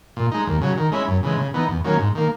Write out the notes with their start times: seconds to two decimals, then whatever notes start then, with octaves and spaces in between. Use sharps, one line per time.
0.16 A#2
0.32 G#3 D#4
0.47 D#2
0.61 C#3 F#3
0.77 D#3
0.92 G#3 C#4 E4
1.08 F#2
1.23 C#3 E3 G#3
1.38 C#3
1.54 E3 B3 D#4
1.68 E2
1.84 D#3 F#3 A#3 C#4
1.99 G#2
2.15 D#3 A#3